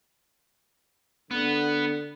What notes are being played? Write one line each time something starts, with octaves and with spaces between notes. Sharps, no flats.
D3 B3